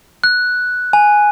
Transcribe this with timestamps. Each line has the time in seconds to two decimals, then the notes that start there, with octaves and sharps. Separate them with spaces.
0.24 F#6
0.93 G#5